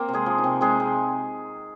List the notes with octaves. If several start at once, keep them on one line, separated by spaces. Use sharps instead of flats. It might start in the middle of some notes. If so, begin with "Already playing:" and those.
Already playing: A#3 C4 A#4
C3
G#3 G#4
F3
D#4
C3
G#3 C4 G#4
C3